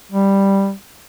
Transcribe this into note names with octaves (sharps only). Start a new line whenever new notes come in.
G3